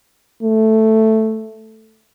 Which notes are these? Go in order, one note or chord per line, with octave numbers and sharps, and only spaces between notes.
A3